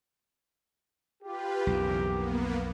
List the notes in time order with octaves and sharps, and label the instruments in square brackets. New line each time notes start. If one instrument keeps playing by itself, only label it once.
[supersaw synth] F4 B4 [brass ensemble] G4
[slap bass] B1 F2 [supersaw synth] C#3 E3 A#4
[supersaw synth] A#3 B3